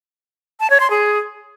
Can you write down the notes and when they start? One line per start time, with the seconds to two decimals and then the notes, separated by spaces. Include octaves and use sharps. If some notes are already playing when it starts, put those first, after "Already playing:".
0.60 A5
0.70 C#5
0.80 C6
0.90 G#4